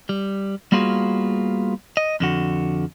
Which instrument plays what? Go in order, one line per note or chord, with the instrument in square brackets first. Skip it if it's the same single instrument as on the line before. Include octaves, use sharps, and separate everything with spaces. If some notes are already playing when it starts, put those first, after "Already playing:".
[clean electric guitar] G3
G3 A#3 B3 F4 F#4 G#4
D#5
F2 D3 F#4